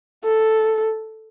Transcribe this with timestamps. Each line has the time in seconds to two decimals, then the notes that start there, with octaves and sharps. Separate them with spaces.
0.24 A4